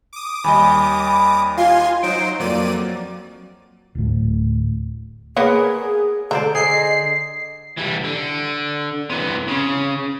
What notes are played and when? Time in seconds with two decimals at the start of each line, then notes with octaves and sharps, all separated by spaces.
0.13 D6 D#6
0.44 D#2 G3 D#5 G#5 B5
1.07 G#5 B5
1.57 F4 F5 G#5 C6
2.03 F#3 D#4 C5 D7
2.40 F2 F#3 A#3 D5 D#7
3.95 D1 A2
5.36 A#3 B3 G#4 A#4 B4 C#5
6.31 D3 A4 C5 D5 A#5
6.55 G#4 D#5 C7
7.77 E3 G3
8.04 D3
9.10 C3 E3
9.48 C#3